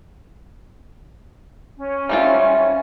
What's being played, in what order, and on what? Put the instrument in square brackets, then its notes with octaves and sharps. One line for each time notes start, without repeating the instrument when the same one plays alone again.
[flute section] C#4
[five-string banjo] G3 C4 F4 [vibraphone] E5